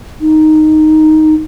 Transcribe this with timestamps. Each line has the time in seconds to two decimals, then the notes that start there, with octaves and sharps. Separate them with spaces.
0.21 D#4